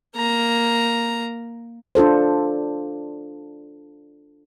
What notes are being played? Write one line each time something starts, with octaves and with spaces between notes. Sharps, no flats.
A#3 A#5
D4 F4 A4 C5